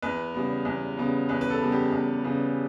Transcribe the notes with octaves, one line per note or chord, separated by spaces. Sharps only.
E2 B4
C#3 G3 B3
E2
C#3 G3 B3
E2 B4
B4
A4
C#3 G3 B3
G4
E2
C#3 G3 B3